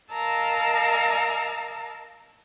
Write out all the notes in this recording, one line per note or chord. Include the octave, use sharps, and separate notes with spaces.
A#4 D#5 F5 A5 A#5 E6